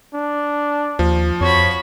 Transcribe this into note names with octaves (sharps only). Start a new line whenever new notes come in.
D4
D#2 F3
F2 F#4 C#5 B5